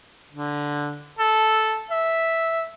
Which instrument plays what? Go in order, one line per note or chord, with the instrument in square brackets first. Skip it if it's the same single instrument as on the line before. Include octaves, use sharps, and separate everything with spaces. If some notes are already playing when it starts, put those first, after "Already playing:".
[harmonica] D3
A4
E5